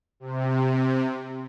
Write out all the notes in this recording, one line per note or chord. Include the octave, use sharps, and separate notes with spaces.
C3